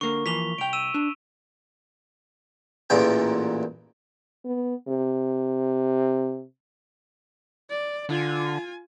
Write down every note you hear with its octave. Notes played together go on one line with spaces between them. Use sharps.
D3 A#3 C#6
E3 F3 A#3 B6 F7 G7
C2 G5 D7 F7
E6 D#7 E7
D4
A1 E2 A#2 G5
B3
C3
D5
D3 F4 G#5